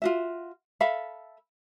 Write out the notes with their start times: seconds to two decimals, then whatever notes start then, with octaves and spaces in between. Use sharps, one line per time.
0.02 F4 F#4 E5
0.80 A4 E5 F5 B5